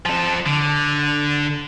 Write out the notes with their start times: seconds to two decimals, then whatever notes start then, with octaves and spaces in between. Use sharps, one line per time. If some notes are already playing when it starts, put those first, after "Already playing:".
0.06 F3 A4
0.46 D3